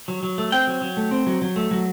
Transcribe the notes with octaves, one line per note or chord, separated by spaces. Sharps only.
F#3
F#3
A3
C4 G5
F#3
F#3
A3
C4
F#3
F#3
A3
F#3